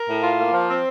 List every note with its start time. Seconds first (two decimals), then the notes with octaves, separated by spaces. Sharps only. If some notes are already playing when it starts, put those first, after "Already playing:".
Already playing: A#4
0.09 A2
0.23 F4
0.38 A#3
0.53 F3
0.68 C4